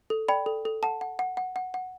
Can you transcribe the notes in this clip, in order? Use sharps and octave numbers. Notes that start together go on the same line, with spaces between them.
A4
D5 G5 B5
A4
A4
F#5 A5
F#5
F#5
F#5
F#5
F#5